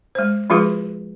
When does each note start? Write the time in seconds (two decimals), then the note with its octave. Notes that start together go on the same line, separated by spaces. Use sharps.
0.15 G#3 C5
0.50 F3 G#3 F4 F#4 G#4 B4